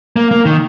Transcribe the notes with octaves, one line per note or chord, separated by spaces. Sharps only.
A#3
A#3
D#3